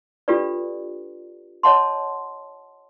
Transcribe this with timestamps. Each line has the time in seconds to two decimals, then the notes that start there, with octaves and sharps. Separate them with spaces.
0.28 D4 F4 G4 A4 B4 D5
1.63 C#5 D#5 F#5 A5 C6